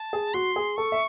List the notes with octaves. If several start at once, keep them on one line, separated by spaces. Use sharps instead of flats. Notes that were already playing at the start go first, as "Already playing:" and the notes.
Already playing: A5
G#4
F#4 C6
G#4
A4 C#6
E5